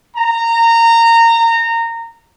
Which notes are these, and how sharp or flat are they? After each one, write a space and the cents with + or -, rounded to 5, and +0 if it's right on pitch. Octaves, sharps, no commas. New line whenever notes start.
A#5 -20